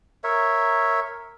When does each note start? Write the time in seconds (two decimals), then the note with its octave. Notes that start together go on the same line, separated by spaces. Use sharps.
0.24 A#4 C#5 E5